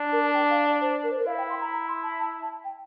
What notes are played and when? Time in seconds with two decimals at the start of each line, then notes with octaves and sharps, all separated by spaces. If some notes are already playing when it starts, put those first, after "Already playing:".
Already playing: D4
0.13 A#4
0.24 A5
0.35 G5
0.50 F5
0.66 D5
0.81 C5
1.04 A#4
1.12 C5
1.19 A#4
1.27 E4 F5
1.38 G5
1.50 C6
1.61 A#5
1.73 A#5
1.88 C6
2.03 A5
2.19 A5
2.41 A5
2.64 G5